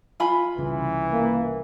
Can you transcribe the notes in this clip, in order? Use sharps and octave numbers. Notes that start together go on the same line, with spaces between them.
F4 G#5 B5
C2 C#3 E3
A#3